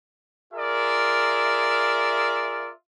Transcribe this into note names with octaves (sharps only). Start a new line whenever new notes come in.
F4 G#4 A#4 D5 E5